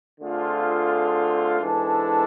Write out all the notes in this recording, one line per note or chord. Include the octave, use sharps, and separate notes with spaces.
D3 A3 C4 F4 G#4
G#2 E3 G#3 D4 A4